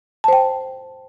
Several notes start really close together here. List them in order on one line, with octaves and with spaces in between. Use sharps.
A5 C5 G5